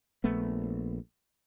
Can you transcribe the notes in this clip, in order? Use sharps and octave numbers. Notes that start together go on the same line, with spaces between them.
A#1 A3 B3